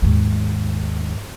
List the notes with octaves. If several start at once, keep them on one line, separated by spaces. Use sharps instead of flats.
D#2 G#2